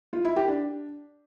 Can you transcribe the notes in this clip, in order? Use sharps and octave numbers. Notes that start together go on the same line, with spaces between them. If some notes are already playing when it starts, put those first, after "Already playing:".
F4
E4
G4
D4